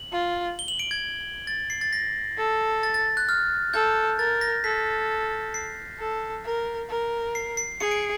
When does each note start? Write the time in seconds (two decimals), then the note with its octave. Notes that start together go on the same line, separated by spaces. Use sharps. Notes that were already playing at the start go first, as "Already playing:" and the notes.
Already playing: F#7
0.12 F4
0.59 G7
0.68 F#7
0.79 D7
0.91 G#6
1.47 A6
1.70 C7
1.81 A6
1.93 A#6
2.38 A4
2.83 A6
2.94 A6
3.17 F#6
3.29 F6
3.73 A4 G6
4.18 A#4 A6
4.41 A#6
4.64 A4 B6
5.54 C7
5.99 A4
6.45 A#4
6.89 A#4
7.35 C7
7.57 C7
7.80 G#4 C#7
7.91 D7